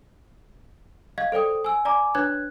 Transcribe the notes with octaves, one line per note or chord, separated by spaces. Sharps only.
D#5 F5 G#6
A4 C5 D5 G5 D#6
G#5 E6
D5 G#5 A#5 D6
D4 B4 C#5 F#6 G#6